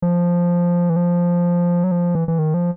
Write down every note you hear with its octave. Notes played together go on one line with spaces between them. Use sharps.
F3
E3
F3
F#3
F3
E3
E3
D#3
F3